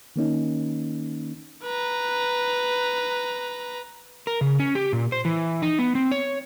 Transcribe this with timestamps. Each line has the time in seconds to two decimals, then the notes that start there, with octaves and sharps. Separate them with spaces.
0.16 D#3 A#3 C#4 D#4
1.64 B4 A#5
4.27 A#4
4.41 C#3
4.60 C#4
4.75 G4
4.93 A#2
5.12 C5
5.25 E3
5.62 D#4
5.79 B3
5.95 C4
6.12 C#5